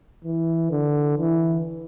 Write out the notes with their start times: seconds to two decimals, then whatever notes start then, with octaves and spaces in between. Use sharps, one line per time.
0.25 E3
0.71 D3
1.18 E3